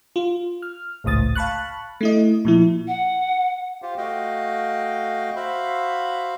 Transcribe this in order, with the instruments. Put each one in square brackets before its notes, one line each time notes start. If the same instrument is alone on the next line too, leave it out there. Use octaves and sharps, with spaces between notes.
[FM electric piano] F4
F6
G#1 C#2 A2 D#6 A6
F5 A5 B5 C#6 F#6
A3 E4 D#5
A#2 F3 E4
[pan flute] F#5
[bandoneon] F4 G4 C5 F5
A3 F#4 D#5 F5 G5
F#4 C5 E5 F5 B5